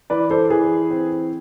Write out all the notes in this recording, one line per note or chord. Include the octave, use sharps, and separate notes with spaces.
E3 B4 D5
A4 C5
E3 G#4 B4
C4